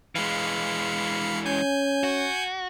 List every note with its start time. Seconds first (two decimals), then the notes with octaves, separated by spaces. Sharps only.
0.15 E3 G#3 F5 B5 C#7
1.46 C#4 G#5 G6
2.03 F#4